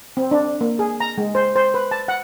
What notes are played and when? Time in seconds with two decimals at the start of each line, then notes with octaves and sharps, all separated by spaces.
0.17 C4
0.31 D4
0.61 A#3
0.79 G#4
1.00 A#5
1.18 G#3
1.35 C5
1.56 C5
1.74 B4
1.91 A5
2.08 F#5